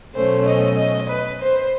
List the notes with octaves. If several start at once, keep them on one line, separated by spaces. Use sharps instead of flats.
B2 F#3 A3 C#4 C5
D#5
D#5
B4
C5